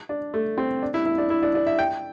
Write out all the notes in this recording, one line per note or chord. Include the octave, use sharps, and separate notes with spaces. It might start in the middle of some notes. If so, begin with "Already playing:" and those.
D4
A3
C4
D4
E4
E4
D4
E4
D4
D4
E5
G5